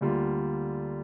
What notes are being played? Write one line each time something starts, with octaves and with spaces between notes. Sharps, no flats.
D2 D3 G3 A#3 F4